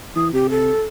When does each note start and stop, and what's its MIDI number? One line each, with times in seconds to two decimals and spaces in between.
0.16 0.29 52
0.16 0.28 87
0.33 0.71 48
0.33 0.48 67
0.50 0.81 69